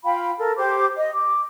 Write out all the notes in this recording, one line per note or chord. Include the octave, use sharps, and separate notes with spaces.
F4 F5 G5 B5
A4 A#4
G4 C5 D6
D#5
D6